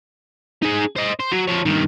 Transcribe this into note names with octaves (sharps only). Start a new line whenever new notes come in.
D#4 G#4
C5 D#5
C5
F#3
F3 C#5
G2 D#3